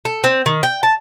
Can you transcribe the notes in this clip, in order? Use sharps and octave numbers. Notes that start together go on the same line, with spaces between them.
A4
C4
D#3
G5
A5